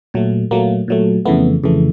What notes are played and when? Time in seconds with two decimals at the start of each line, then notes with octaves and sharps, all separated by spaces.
0.14 A#2 F#3 A3
0.51 A#2 F#3 A3 A#3
0.88 A#2 F#3 A3
1.25 F2 C#3 E3 A3 B3
1.64 F2 C#3 E3 A3